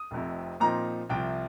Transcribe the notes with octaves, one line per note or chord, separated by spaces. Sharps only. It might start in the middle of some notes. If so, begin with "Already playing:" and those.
Already playing: D#6
F1 F2 C3
A#2 F3 C4 D#4 A#5
C2 C3 F3 G5